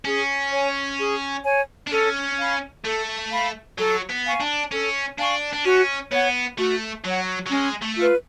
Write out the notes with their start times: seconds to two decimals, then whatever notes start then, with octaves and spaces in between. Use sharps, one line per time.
0.05 C#4 G#4
0.51 C#5 G#5
0.99 G#4
1.45 C#5 G#5
1.87 D4
1.91 C#4 A4
2.39 F5 B5
2.85 A3 A4
3.31 F5 B5
3.78 F#3 A4
4.09 B3
4.25 F5 G#5 C#6
4.40 D4
4.71 C#4 A4
5.18 D4 F5 G#5 C#6
5.53 D4
5.65 C#4 F#4
6.11 B3 C#5 F#5
6.58 A3 F#4
7.04 F#3 C#5 F#5
7.47 F#3
7.51 G#3 C#4
7.82 A3
7.98 F4 B4